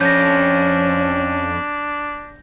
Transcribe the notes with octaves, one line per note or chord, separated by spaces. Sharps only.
F2 C#4 D4 G6 A#6